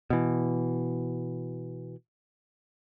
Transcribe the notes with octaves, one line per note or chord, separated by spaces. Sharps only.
B2 E3